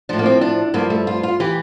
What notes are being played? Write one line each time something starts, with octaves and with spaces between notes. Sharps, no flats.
A2 F3 D4
A#3
C4
D4
G2 F3 A#3
A3
F4
F4
E3 G4